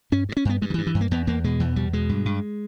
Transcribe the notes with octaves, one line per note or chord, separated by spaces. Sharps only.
G2 C#4
G2
C#4
G2 B3
G2 G#3
D#3
E3
G2
E3
G2
A#3
E2 B3
E2 A#3
B2 G#3
E2 E3
E2 G3
B2 G#3
G2
G2